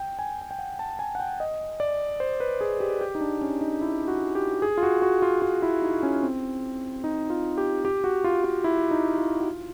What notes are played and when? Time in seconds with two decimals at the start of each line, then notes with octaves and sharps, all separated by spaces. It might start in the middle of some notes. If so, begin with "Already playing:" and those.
Already playing: G5
0.19 G#5
0.41 G#5
0.51 G5
0.59 F#5
0.79 A5
0.99 G#5
1.15 F#5
1.20 G5
1.40 D#5
1.80 D5
2.20 C5
2.40 B4
2.61 G#4
2.80 G4
3.01 G4
3.15 D#4
3.21 D4
3.41 C#4
3.61 D#4
3.81 E4
4.08 F#4
4.35 G4
4.62 G#4
4.78 F4
4.83 F#4
5.02 F#4
5.22 F4
5.42 F4
5.62 E4
5.82 D#4
6.03 C#4
6.23 C4
7.04 D#4
7.30 F4
7.58 G4
7.85 G4
8.04 F#4
8.24 F4
8.44 F4
8.64 E4
8.91 D#4
9.18 F4
9.40 F#4
9.45 F4